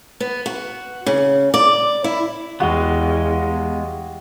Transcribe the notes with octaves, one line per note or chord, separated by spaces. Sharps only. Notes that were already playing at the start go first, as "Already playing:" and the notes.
B3
F#4
C#3
D5
E4
E2 G#3 B3 F#4 G4 F5